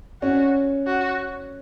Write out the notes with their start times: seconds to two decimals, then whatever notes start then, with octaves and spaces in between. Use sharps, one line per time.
0.22 C#4 F#4
0.86 F#4